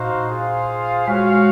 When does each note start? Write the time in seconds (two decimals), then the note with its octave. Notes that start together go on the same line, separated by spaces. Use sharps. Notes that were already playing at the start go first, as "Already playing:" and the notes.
Already playing: A#2 D#4 F#4 C5 F5
0.30 F4 G#4 C5 F5
1.07 G#3 F#4 C#5 F5